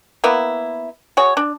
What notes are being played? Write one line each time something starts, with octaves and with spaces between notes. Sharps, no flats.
A#3 B3 E4
F#4 G#4 C#5
D4